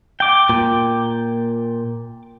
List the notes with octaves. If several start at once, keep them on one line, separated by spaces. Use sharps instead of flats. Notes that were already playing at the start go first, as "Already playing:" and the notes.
G5 D6
A#2